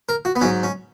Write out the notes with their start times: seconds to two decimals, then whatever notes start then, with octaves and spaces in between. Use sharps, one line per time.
0.09 A#4
0.25 F#4
0.36 B3
0.41 G#2 F#3 C#4
0.63 C#4